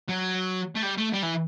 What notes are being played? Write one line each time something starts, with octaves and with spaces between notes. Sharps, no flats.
F#3
A3
G3
A3
G3
E3